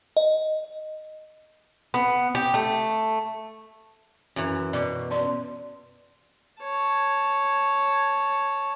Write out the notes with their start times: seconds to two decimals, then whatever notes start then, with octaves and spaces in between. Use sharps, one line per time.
0.17 D#5
1.94 B3
2.35 G4
2.54 A3
4.36 F#2 E3
4.73 B2 D5 D6
5.10 C#4 D5 C6
6.63 C#5 A5